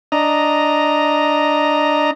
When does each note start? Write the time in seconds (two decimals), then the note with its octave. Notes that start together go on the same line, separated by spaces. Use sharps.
0.12 D4 D#5 A#5